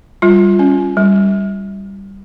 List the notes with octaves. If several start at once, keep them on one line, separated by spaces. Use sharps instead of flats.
G3 F4
C#4
G3